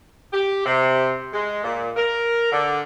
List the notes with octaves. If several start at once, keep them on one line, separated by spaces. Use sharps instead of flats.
G4
C3
G#3
A#2
A#4
D3